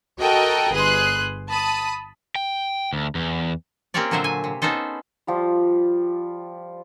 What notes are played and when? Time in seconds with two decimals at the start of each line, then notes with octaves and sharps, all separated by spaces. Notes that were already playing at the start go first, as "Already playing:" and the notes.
0.20 F#4 A4 A#4 D#5 F#5 G5
0.72 G1 G#4 B4 C6 F#6
1.49 A5 B5 D#6
2.35 G5
2.93 D2
3.15 E2
3.94 A#3 C4 C#4 G4 C#5 D5
4.11 A#2 D3 F#3 C5 C#5 E5
4.24 G#5
4.44 C3
4.62 B3 C#4 D#4 A4 C5
5.27 F3 G3 F4